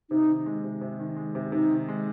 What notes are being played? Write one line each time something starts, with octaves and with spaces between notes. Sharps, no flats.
C3 D#4
D#3
G#3
C3
C3
D#3
G#3
C3
C3 D#4
D#3
G#3